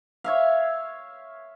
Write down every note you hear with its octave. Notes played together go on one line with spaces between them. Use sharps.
C#5 E5 F5